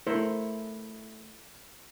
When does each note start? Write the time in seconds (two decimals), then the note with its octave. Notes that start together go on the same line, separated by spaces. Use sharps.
0.07 A3 E4 A#4 C5